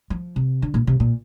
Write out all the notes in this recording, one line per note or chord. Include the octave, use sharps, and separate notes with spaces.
F3
C3
D3
A#2
C3
A#2